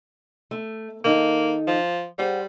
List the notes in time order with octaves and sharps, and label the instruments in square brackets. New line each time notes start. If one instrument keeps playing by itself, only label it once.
[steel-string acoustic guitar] A3
[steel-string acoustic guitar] D#3 D#4 A4 [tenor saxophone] A#3
[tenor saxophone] F3
[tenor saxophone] G3 [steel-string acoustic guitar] G#4 C5 F#5